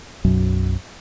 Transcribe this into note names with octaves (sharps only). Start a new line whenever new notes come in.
B1 F#2 F#3